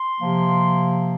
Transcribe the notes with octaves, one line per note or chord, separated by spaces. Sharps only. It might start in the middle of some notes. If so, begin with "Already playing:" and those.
Already playing: C6
C3 F3 A#3